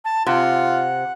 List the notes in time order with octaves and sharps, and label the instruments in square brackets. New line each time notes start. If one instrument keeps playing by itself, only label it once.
[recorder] A5
[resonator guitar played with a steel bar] C3 [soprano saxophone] F4 [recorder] F#5